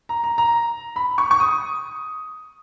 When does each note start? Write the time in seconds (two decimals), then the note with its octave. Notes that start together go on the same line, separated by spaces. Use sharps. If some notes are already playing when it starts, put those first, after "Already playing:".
0.09 A#5
0.24 A#5
0.38 A#5
0.96 B5
1.18 C#6
1.31 C#6
1.40 D#6